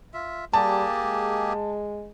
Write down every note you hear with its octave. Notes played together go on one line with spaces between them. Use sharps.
F4 E5
G3 A#3 G4 G#4 A5
G#3